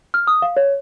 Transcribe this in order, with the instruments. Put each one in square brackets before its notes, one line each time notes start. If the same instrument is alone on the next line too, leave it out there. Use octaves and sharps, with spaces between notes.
[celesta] F6
D#6
F5
C#5